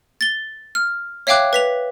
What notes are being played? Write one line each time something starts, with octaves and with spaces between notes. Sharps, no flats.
A6 G7
F6
C#5 E5 F5 G5 D6 F#6
B4 B6 F7